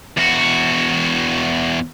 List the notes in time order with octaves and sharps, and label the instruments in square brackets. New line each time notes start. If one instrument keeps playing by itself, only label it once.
[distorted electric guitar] E2 F#4